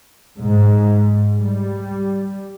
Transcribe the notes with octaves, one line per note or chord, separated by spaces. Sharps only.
G#2
G3